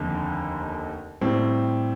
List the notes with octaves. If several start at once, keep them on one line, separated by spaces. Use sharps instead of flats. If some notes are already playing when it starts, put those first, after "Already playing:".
Already playing: F1 D#2 D3
A2 G3 C4